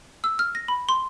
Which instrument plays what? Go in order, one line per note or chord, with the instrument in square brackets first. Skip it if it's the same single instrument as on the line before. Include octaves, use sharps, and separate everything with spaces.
[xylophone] E6
F6
A#6
B5
C6